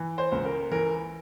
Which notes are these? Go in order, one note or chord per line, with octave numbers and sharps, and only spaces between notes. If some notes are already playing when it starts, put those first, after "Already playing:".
Already playing: E3
C5
C#2
A#4
E3 A#4